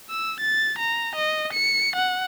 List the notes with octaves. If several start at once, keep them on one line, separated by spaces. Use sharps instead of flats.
E6
A6
A#5
D#5
C#7
F#5